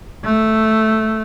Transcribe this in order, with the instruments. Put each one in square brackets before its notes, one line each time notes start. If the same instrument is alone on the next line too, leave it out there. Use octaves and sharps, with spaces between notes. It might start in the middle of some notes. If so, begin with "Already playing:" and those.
[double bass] A3